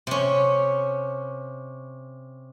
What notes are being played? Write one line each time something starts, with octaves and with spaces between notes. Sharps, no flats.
C3 C#4